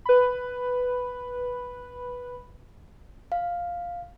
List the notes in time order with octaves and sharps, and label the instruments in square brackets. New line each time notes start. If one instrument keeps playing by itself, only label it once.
[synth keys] B4 B5
[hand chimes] F5